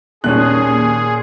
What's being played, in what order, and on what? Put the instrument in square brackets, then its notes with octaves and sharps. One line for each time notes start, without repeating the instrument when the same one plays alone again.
[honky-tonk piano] D#2 C#4 [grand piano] A#2 F#6 [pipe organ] G#4